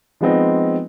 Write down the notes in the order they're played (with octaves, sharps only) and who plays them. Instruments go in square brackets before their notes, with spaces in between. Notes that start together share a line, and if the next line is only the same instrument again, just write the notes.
[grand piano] F3 G#3 B3 C4 D#4